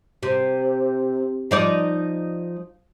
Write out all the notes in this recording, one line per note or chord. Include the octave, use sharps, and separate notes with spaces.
C3
F3 D#4 D5